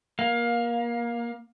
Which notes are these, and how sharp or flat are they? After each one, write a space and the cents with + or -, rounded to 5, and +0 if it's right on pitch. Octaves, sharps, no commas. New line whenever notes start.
A#3 +25 F5 +20